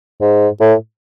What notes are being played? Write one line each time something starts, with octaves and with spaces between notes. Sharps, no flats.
G#2
A2